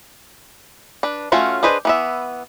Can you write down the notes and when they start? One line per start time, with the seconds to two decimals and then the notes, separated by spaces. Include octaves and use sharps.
1.03 D4 B4
1.32 A3 C#4 F4 F#4
1.63 D4 G#4 B4 C5 D#5
1.85 E3 B3 E5